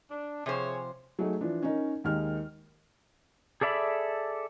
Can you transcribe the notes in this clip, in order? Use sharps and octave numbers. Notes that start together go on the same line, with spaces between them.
D4
C3 F3 G#4 C5 C#5
F#3 A3 D#4 G#4
E3 F3 D4 F4
C#4 D#4 A#4
D#2 D#3 G#3 F6
G#4 A4 D5 E5 B5